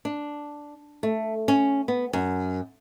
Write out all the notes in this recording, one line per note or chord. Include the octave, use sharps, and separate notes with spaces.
D4
A3
C#4
B3
F#2